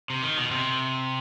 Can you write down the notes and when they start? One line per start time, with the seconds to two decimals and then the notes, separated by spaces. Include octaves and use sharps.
0.10 C3
0.23 D#3
0.37 B2
0.51 C3